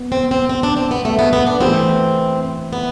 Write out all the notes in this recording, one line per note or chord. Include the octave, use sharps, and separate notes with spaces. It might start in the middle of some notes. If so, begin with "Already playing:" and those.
Already playing: B3
C4
C4
C4
D4
C4
B3
A3
B3
B3
D4
E3 A3 C4 E4 B4
B3